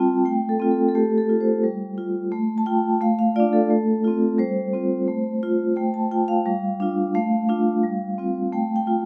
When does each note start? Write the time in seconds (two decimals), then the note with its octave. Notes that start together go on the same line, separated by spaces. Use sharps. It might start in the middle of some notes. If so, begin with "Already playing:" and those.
Already playing: G3 C4 F4 G5 A5
0.25 A3 G5
0.49 A4
0.60 C4 F4
0.71 A4
0.88 A4
0.95 A3 G4
1.18 A4
1.29 F4
1.41 C5
1.64 G3
1.98 F4
2.32 A3
2.58 A5
2.66 F4 G5
3.01 A3 F5
3.19 F5
3.36 D4 F4 D5
3.53 A4
3.70 A3
4.04 C4 F4
4.38 G3 C5
4.73 C4 F4
5.08 A3
5.43 F4
5.76 A3 G5
5.94 A5
6.11 F4 G5
6.28 F5
6.46 G3
6.80 D4 F4
7.14 A3 F5
7.49 D4 F4
7.83 G3
8.18 C4 F4
8.53 A3 G5
8.76 G5
8.87 F4